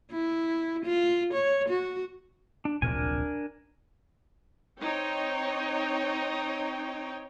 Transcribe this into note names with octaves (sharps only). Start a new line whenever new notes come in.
E4
F4
C#5
F#4
D4
D1 A#1 C3 D4 A#4 G#5
C4 D#4 C#5 G5